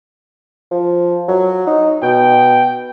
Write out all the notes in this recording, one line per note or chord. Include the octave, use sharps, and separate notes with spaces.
F3
F#3
D#4
B2 G5